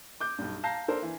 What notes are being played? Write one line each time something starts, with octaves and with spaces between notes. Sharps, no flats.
D6 G6
B1 G2
F5 A5 A#5 G6 A#6 C7
D4 A4 A#4 C5
E3